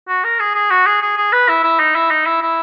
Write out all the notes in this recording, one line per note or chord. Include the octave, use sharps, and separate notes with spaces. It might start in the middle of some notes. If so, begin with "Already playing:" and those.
F#4
A#4
G#4
G#4
F#4
G#4
G#4
G#4
B4
E4
E4
D#4
E4
D#4
E4
E4